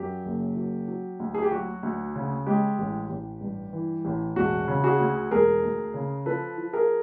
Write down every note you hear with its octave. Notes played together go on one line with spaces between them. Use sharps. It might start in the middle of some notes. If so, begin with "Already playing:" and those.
Already playing: F#2 G4
F#1
F#3
F#3
D2
G#4
G4
F#3 F#4
D2
C#3
G#3 G4
A1
A1
G2
E3
A1
E1 F#4
C#3
F#4 G#4
D2
E1 G#4 A#4
D2
C#3
F3 A4 B4
F3
G#4 A#4